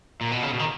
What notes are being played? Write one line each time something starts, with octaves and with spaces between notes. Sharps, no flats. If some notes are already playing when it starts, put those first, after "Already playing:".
A#2
B2
C#3
B2
D#3